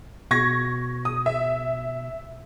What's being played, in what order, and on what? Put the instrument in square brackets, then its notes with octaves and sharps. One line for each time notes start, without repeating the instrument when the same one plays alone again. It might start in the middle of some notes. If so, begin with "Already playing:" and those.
[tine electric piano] B2 [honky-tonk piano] C#6 G#6 A#6
[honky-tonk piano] D#6
E5